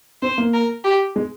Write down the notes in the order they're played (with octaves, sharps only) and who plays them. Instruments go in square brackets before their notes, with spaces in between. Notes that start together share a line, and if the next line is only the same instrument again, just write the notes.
[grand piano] C4 [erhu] C5
[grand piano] A#3
[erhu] A#4
G4
[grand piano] G#3